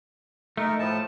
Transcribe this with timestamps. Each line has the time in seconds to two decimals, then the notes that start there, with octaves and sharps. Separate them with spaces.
0.57 A3 D#4 A#4
0.79 A2 F3 A5